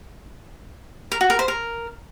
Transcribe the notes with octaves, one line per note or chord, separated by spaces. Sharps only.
A#4
F#4
A#4
C5
A#4